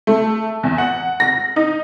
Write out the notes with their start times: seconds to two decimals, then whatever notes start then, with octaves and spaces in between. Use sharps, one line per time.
0.07 A3
0.63 E2
0.78 F#5
1.20 A#6
1.56 D#4